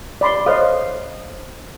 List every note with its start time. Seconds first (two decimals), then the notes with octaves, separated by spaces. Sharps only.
0.21 D5 B5 C6
0.46 A4 C5 C#5 D#5 F5